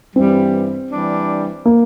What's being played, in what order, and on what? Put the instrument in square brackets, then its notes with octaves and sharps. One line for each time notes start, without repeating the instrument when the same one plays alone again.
[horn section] G2 E3 G3 [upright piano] C4
[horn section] E3 G3 D4
[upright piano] A#3